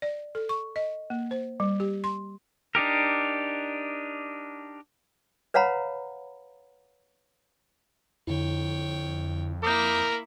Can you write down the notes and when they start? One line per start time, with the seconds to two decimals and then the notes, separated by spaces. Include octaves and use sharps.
0.02 D5
0.35 A4
0.49 C#6
0.76 D#5
1.10 A#3
1.31 C5
1.60 G3
1.80 G4
2.04 C6
2.75 D4 D#4 G4 A#4
5.54 B4 C#5 F5 F#5 A#5 B5
8.27 F2 D3 E4 C#5 G5
9.63 A#3 E4 A#4 D6 D#6 G6